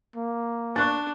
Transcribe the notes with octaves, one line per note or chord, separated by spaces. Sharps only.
A#3
D4 C#6 F#6 A6